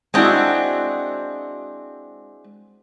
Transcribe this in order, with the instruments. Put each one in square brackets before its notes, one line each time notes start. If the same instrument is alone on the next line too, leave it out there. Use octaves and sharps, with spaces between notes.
[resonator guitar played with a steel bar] G#3 C4 D4 E4 F#4